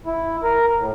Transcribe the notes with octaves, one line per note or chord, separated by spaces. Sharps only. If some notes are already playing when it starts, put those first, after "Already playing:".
E4
A#4
A2